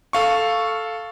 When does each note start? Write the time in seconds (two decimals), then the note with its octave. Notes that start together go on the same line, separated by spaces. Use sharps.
0.13 A4 F5 C#6